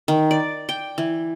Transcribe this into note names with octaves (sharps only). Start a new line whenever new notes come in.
D#3
D5
G5
E3